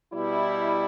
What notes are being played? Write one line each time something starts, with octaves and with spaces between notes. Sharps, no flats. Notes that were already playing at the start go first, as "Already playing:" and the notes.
B2 G3 E4